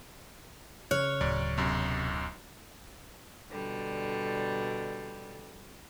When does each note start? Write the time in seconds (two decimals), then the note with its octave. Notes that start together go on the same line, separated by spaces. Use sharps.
0.91 C#3 C#5 F6 F#6
1.21 D1 F#2 D5
1.57 B1 F#2 C3
3.51 B2 D3 G3